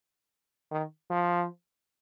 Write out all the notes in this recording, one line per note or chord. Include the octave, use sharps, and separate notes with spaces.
D#3
F3